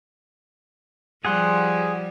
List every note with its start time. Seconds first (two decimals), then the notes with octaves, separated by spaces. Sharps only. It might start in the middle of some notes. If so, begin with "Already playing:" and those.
1.25 F3 G3 G#4 F#5 C6